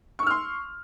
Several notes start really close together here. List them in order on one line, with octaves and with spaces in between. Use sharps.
C#6 E6 F6 C6